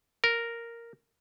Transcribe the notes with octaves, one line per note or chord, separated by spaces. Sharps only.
A#4